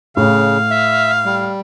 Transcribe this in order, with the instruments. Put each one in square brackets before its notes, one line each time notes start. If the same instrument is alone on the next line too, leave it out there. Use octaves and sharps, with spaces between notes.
[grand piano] A2 [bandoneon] C#3 [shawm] F5
[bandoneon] E5
G3